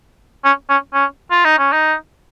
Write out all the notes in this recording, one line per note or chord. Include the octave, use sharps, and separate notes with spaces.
C#4
C#4
C#4
F4
D#4
C#4
D#4